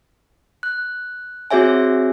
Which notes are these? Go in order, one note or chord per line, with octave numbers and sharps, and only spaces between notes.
F#6
C4 F#4 G#4 C#5 E5 G#5